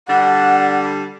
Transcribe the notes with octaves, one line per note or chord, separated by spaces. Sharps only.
D3 G3 D4 F#5